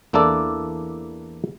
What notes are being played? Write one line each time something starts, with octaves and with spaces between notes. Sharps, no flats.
E2 A#3 D4 E4 A4 D5